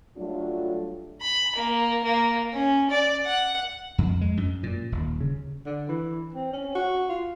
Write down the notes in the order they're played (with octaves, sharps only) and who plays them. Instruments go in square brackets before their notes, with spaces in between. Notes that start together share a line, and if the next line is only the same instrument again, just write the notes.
[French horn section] F#3 G3 A3 D4 F4
[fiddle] B5
A#3
A#3
C#4
D5
F#5
[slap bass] F2
G#3
F#2
A#2
D#1
C#3
[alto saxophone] D3
E3
C4
C#4
F#4
F4